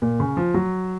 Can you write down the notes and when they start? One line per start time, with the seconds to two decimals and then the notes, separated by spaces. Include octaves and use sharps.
0.02 A#2
0.20 C#3
0.37 F3
0.54 F#3